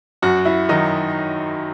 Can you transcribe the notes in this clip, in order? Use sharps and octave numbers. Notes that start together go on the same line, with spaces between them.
F#2 F#4
E4
D#3 F#3 D#4